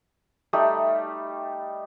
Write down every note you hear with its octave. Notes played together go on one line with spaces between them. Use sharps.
G3 A3 D#4